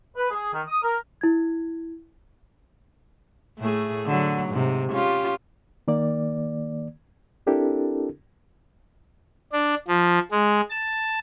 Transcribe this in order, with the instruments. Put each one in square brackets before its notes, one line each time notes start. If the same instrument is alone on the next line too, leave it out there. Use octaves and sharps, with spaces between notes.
[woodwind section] B4
G#4
D#3
D#6
A#4
[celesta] E4 G#6
[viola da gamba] A2 A3 G#4
D3 F#3
G#2 C3
C#4 F4 G4
[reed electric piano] D#3 A#3 D5
C4 D4 E4 G4 A4 A#4
[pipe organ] D4
F3
G#3
A5